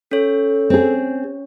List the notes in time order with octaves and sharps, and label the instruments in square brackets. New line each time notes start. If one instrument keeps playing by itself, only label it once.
[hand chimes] C#4 C#5 [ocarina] A4
[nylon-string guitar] C4 G#4